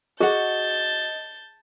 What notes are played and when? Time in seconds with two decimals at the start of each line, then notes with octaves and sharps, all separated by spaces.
0.21 F#4 G#4 D#5 F#5 A5 G6